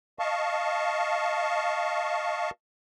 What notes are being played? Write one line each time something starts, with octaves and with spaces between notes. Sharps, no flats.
D#5 F5 A5 C#6